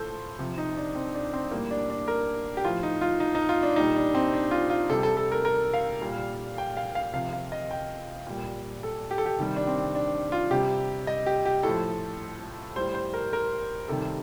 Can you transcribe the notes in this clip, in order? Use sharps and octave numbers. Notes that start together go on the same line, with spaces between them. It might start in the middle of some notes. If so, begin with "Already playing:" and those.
Already playing: A2 F3 A4 C5
C3 F3
D#4
D4
C4
D4
C4
A2 G3 A#3
D4
D4
A#4
G4
A2 F3 F4
D#4
F4
D#4
D#4
F4
D4
A#2 G3 D#4
D4
C4
D4
F4
F4
C3 G3 A4
A4
A4
A#4
A#4
F5
A#2 G3
G5
F5
F5
C3 F3 F5
F5
D#5
G5
A#2 G3
A4
G4
A4
G4
C3 D#3 G3
D4
C4
D4
F4
C3 G3 G4
D#5
G4
G4
A2 F3 A4
A2 G3 C5
C5
A#4
A#4
C3 D#3 G3 A4